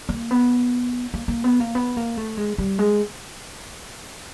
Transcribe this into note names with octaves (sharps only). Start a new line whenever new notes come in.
A#3
B3
A#3
A#3
B3
A#3
B3
A#3
A3
G#3
G3
G#3